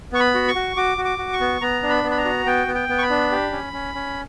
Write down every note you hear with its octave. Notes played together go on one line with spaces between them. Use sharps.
B3 C#6
B5
F#4
C#6
F#4
F#4 D6
F#4
D6
F#4
C#6
B3
B3 A#5
D4
B5
B3
B5
A#5
F#4
B3 G5
B3
G5
B3
C#6
B5
D4
G4
C#4
C#4
C#4